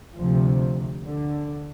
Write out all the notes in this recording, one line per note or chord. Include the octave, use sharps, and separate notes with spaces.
D2 C3 F3
D3